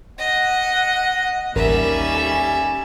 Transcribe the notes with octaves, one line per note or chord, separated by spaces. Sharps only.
D#5 F#5
A1 D#2 G3 C#4 A#4 E5
A4 G#5